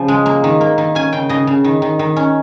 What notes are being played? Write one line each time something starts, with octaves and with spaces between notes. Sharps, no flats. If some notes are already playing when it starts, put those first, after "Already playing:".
Already playing: C#3 F3
G#3
A#3
D#3
A#3
D#3
C#4 G#5
C#3 G5
C#3 D#5
C#3
D#3
D#3
D#3
C#4